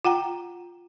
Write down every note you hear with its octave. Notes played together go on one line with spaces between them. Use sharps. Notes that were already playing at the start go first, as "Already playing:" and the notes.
F4 F#5 G5 A#5